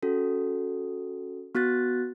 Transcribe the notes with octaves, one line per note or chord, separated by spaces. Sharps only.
C#4 F#4 A4
B3 F#4 F#6 A6